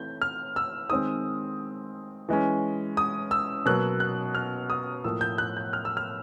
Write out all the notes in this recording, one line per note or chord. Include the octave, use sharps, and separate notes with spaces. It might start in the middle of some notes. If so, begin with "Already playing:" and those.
Already playing: E3 A3 C4 G6
F6
E6
D#3 G#3 C4 D#6
E3 G#3 C#4
D#6
E6
B2 F#3 A#3 F#6
F#6
F6
D#6
A2 F3 A#3 E6
G6
F#6
G6
F6
E6
F6